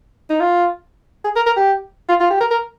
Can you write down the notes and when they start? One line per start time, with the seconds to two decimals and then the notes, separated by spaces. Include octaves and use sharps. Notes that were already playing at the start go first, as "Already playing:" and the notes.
0.30 D#4
0.40 F4
1.24 G#4
1.36 A#4
1.46 A#4
1.56 G4
2.09 F4
2.20 F4
2.30 G4
2.41 A#4
2.51 A#4